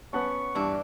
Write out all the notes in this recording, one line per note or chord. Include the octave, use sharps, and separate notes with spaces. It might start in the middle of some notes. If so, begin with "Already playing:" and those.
B3 C#4 F#5 A5 C#6
G2 E3 D4